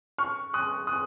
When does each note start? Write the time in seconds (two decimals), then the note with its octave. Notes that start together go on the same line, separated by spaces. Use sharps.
0.18 C#6 F6
0.54 D#6 F#6
0.87 D#6 F#6